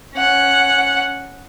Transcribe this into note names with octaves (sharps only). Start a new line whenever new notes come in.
C#4 F#5